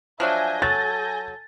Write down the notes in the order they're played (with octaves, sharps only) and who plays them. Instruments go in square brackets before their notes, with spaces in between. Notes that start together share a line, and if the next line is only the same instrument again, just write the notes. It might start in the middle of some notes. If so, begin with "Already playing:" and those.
[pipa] F3 F#3 D4 [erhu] E5 [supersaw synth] G#5 G6 A#6
[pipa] F#3 [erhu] A4 [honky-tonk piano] A6